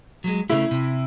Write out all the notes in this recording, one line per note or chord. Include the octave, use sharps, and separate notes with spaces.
F#3 G#3
C#3 A3 E4
C3